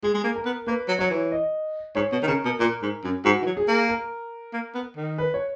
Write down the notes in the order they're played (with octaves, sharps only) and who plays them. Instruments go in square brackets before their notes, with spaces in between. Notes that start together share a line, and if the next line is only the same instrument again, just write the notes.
[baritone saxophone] G#3 [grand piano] G#4
[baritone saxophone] G#3
A#3
[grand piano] A#4
[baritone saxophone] B3
[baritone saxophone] A#3 [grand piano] B4
[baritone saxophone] F#3
[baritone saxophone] F#3 [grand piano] C#5
[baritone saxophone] E3
[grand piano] D#5
[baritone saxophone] G#2 [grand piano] C#5
[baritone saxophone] B2
D#3
[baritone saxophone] C#3 [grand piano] A#4
[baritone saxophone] B2
[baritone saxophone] A#2 [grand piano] A#4
[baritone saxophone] G#2
F#2
[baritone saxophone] G#2 [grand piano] F#4
[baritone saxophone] E3
F#3
[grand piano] G#4
[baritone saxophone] A#3
[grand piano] A#4
[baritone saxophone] A#3
B3
D#3
[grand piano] B4
C#5